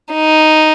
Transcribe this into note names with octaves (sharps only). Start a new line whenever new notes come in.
D#4